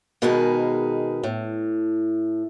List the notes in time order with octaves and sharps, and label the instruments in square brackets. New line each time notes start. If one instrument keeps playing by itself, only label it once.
[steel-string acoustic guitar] B2 D#3 G#3 G#4 A#4 B4
A2